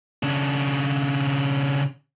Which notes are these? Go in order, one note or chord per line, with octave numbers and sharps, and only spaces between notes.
C#3 D4